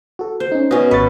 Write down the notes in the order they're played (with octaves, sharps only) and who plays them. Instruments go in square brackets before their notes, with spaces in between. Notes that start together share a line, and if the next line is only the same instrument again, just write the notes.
[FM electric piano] F#4 A4
[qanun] C5
[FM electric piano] C#4 D#4
[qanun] B2 C#4 [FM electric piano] D#5
[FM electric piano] G#1 C#6 A6 [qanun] B4